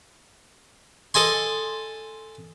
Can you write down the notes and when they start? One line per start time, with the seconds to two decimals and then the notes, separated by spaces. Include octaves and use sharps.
1.14 A4 D#5 G#5 C6